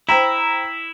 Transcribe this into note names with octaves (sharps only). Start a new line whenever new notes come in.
E4 C5 G5 A#5